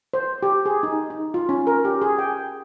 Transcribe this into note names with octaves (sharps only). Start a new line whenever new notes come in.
C5
G4
G#4
D#4
D#4
F4
C#4
A#4
G4
G#4
G5